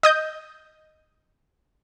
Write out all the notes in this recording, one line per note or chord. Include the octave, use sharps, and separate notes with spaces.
D#5 D#6 G6